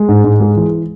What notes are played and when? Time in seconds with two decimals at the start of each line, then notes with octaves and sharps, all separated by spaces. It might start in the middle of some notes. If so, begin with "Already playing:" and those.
Already playing: G#3
0.09 G#2
0.24 G#2
0.40 G#3
0.56 E3